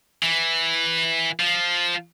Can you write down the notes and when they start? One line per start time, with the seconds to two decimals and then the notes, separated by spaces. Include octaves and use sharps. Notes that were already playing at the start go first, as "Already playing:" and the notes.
0.23 E3
1.40 F3